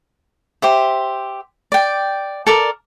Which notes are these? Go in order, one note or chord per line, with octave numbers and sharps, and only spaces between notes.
G4 C5 E5
D5 G5
A4 A#4 D5